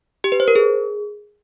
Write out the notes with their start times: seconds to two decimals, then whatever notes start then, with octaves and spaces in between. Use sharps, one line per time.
0.24 G4
0.32 B4
0.40 C5
0.48 A#4
0.55 G#4